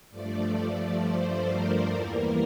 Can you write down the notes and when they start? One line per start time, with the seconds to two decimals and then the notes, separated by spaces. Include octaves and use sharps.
0.10 G2 F3 A3 D5
0.56 D5
1.01 C5
1.46 A#4
1.91 E2 E3 G3 A#3 A#4